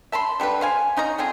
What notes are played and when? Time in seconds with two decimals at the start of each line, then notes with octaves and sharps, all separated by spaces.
0.12 E5 A5 B5 C6
0.40 D3 G3 D4 B4
0.61 C5 F5 G#5
0.97 C#4 D#4 D#5 A#5
1.18 D3 C4 F4 G#4